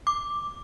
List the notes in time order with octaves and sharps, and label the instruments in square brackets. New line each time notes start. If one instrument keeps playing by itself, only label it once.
[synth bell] D6